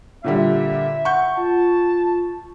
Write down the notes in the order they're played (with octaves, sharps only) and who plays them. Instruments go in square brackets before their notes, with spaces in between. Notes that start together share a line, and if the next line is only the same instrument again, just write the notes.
[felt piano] A#2 D3 G3 [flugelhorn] E5
[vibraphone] F#5 [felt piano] C#6 G6
[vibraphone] F4 [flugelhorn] A5